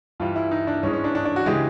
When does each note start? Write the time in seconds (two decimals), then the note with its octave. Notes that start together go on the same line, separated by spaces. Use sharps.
0.20 G2 E3 G3 F4
0.36 E4
0.51 D#4
0.67 D4
0.83 G#2 E3 G#3 C#4
0.93 C#4
1.04 D4
1.15 D4
1.25 D4
1.36 F#4
1.46 C#3 E3 G#3 G4